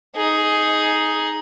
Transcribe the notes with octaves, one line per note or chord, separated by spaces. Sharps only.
D#4 G#4